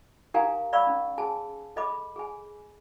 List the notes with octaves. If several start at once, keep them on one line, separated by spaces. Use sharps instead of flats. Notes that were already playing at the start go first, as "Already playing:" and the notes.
D#4 G4 A#4 F5 G#5 A#5
D5 F5 G#5 B5 C#6 E6
C#4
G#4 G#5 A5
A4 D#5 B5 D6
G#4 G#5